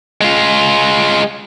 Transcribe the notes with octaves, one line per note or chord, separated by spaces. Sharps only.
G#3 F4